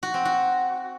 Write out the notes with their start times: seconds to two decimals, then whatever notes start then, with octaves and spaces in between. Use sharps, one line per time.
0.03 F#4
0.14 C4
0.25 F#4